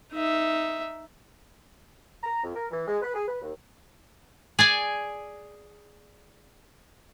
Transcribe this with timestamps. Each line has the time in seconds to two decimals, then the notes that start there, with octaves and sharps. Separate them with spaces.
0.13 D#4 E5
2.23 A#5
2.44 F2
2.55 A#4
2.71 E3
2.88 G#3
3.02 B4
3.14 G#4
3.28 B4
3.42 D#2
4.59 G#4 D5 G#5